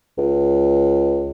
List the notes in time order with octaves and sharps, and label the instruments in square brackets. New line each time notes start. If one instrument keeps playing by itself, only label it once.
[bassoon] C#2